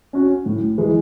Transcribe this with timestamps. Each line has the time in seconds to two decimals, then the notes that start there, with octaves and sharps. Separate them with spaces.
0.13 C#4 F#4
0.46 A2
0.78 E3 G#3